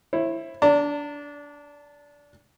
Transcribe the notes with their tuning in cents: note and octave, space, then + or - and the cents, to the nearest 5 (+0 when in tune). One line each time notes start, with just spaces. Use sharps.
E4 +5 C5 +45
D4 -20 A5 +40